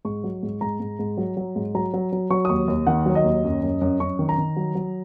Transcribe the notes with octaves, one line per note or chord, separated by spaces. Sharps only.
G#2 C#6
F#3
G#2
G#2 A#5
G#2
G#2
F#3
F#3
G#2
F#3 A#5
F#3
F#3
F#3 C#6
D#6
D#2 C#6
D#2
D#3 F#5
F#3
D#5
D#2
F#2
F#2
F#2
F#2 C#6
D#3
A#5
D#3
F#3
F#3